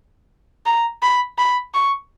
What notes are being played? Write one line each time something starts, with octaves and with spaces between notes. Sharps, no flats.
A#5
B5
B5
C#6